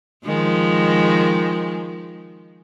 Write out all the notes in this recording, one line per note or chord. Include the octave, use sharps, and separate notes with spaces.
D#3 F3 G#3